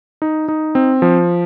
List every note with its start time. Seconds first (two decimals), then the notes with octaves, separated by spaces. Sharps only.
0.22 D#4
0.48 D#4
0.75 C4
1.02 F3